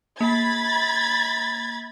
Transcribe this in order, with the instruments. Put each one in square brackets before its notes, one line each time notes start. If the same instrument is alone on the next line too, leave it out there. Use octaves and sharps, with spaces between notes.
[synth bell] A#3 [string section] B5 G#6 A6